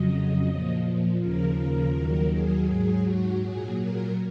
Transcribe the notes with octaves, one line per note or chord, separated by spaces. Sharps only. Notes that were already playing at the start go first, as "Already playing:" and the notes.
Already playing: F2 C#3 F#3 D#5
A#2 F3
D#2 C#3 F3 A#4
A#4
D#2 D#3 F#3
G#4
G#2 F#3 G#4
F#4
A#2 F#3 G#4
A#4